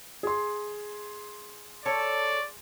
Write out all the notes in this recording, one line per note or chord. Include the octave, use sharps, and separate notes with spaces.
G#4 C6
A4 C#5 D5